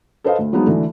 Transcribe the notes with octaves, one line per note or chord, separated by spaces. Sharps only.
A4 B4 C5 D#5 F5
D2
F3 F#3 G#3 B3 D#4 F4
D2 D3 E3